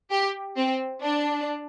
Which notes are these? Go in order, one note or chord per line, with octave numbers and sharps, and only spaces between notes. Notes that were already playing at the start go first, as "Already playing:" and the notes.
G4
C4
D4